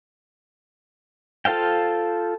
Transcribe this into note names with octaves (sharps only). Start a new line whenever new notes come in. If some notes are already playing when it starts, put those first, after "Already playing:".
F4 A4 C5 F5 G5